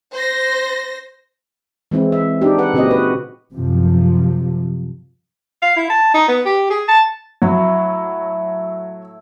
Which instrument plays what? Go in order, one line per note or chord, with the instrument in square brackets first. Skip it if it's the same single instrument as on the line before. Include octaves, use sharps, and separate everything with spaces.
[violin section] C5 A#6
[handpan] E3 G#3 C4 E4
E5
D4 D#4 G4
B4 F#5
A#2 C#3 C4 F#4 G4 D#5
F#4 B4
[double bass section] F#2 C3 F3
[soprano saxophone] F5
E4
A5
D#4
B3
G4
G#4
A5
[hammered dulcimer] A2 A3 E4 [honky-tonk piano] F#3